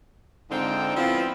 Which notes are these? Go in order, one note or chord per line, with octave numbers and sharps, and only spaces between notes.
G#2 D3 C4 D#4 F4 G5
F3 B3 C4 E4 F4